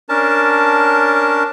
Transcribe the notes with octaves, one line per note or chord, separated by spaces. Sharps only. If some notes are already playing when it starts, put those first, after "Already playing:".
C#4 D4 A#4 A5